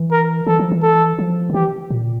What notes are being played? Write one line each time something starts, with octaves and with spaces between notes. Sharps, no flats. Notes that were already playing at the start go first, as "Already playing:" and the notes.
Already playing: E3
A#4
E3 A4
F3
E3
A4
F3
D3
E3 G4
A#2